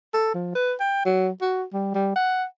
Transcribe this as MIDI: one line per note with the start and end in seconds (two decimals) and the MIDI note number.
0.14 0.34 69
0.34 0.54 53
0.55 0.74 71
0.80 1.03 79
1.05 1.29 54
1.41 1.64 66
1.73 1.90 55
1.94 2.11 55
2.16 2.44 78